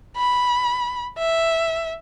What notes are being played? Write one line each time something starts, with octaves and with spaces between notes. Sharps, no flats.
B5
E5